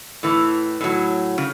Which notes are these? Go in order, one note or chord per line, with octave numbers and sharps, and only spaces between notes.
A2 E3
A2 F#3
C#3